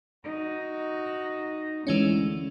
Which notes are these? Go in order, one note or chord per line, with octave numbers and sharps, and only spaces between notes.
D#4 F#4
D2 E3 G#3 C#4